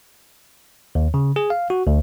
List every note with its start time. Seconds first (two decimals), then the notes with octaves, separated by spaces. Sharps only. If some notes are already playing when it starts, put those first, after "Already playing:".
0.95 D#2
1.14 C#3
1.36 G#4
1.50 F5
1.70 F#4
1.87 D2